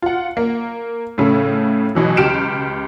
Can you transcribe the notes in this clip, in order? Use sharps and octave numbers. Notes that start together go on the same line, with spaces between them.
F4 F#5
A#3
A2 C#3 A3
B2 E3 F#3
C#2 G4 F6 D7 E7